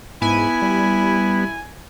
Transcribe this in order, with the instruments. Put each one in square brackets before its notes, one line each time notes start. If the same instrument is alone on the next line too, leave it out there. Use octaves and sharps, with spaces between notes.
[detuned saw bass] G#2 [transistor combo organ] B3 [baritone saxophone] E4 [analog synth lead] G#5
[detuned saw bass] G3